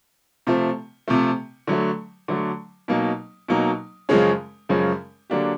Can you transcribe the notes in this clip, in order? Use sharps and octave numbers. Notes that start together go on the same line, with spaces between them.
C3 F3 A3
C3 F3 A3
D3 F#3 A3
D3 F#3 A3
B2 F#3 A#3 D#4
B2 F#3 A#3 D#4
F#2 C#3 F3 G#3 C#4
F#2 C#3 F3 G#3 C#4
D3 F#3 A#3 D4 G4